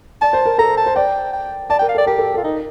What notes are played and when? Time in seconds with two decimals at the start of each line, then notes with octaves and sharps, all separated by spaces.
0.21 D5 A5
0.33 C5
0.46 A#4
0.58 A4 A#5
0.77 A5
0.86 C5
0.95 D5 G5
1.33 G5
1.70 D5 A5
1.79 A#4 G5
1.89 F5
1.95 A4 D5
2.07 G4 A#4
2.19 A4
2.34 F4 A4
2.44 D#4 A#4